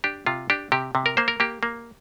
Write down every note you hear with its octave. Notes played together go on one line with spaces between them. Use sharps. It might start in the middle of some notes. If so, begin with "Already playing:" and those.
D4 G4
C3 F4
D4 G4
C3 G4
C3
A#4
A#3 C5
A#4
A#3 G4
A#3